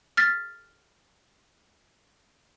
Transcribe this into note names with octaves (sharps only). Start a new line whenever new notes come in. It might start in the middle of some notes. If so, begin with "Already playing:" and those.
F6 A6 B6